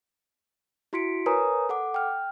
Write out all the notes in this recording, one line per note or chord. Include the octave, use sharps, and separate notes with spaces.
E4 F#4 C6 B6 C#7 D7
A#4 B4 C#5 G#5 A#5 D#6
A4 F#5 D6
G5 F6